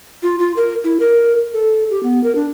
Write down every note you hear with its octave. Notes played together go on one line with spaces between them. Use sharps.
F4
F4
A#4
E4
A#4
A4
G4
B3
A#4
D4